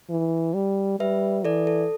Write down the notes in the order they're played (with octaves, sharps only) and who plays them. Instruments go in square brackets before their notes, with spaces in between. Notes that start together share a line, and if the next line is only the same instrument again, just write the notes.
[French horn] E3
G3
[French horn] G3 [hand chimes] B4 E5
[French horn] E3 [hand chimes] A4 D5
[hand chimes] A4